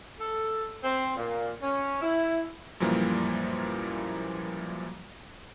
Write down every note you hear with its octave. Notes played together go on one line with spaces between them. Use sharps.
A4
C4
A#2
C#4
E4
F#2 A#2 E3 F3 G3 A#3